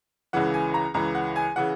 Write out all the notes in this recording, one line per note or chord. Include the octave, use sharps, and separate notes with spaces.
C#2 C#3 E3 F#5
G#5
A#5
C#2 C#3 E3 A#5
F#5
G#5
C#3 E3 F#5